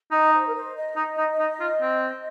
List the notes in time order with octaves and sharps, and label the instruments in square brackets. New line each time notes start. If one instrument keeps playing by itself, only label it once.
[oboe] D#4 [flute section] D#5
[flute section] C5
A#4
C5
D#5
[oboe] D#4
D#4
D#4
F4
C4